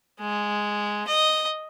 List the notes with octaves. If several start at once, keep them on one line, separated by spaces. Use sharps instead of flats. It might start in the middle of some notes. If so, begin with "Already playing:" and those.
G#3
D#5